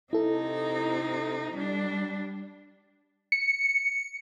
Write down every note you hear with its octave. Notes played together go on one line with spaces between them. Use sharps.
C3 D#4 E4 A4
G3 D4
C#7